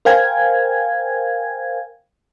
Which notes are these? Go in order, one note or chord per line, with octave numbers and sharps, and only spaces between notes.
A#4 C5 F5 G5 G#5 G#6